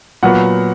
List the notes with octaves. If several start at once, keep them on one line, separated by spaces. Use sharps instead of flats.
A#2 F#3 B3 F#5